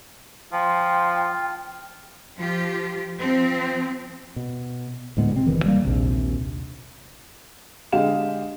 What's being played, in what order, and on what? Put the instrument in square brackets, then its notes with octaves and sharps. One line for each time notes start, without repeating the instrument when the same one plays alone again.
[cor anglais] F3 [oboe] F4 [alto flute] G5
[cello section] F3 F4 G4
F3 C4
[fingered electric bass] B2
D2 A2 G#3 B3
C3 C4
E1 D2 D#3 E3
G3 A#3
A#1 D#2 C3
[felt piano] D3 G#3 G4 D#5 F5 E7